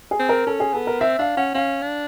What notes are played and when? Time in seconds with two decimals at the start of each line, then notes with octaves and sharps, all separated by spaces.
0.11 G#4
0.19 C4
0.29 A#4
0.47 C#4 A4
0.60 G#4
0.73 B3 A4
0.87 A#4
1.01 C4 E5
1.18 D4 F5
1.37 C#4 F#5
1.54 C#4 F5
1.82 D4